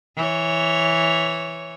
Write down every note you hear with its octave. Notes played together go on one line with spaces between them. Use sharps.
E3 C#5